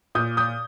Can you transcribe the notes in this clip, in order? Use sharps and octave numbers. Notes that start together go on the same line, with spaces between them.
A#2 D#6 G6
D#6 G6